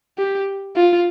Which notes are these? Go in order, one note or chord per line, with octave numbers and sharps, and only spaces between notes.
G4
F4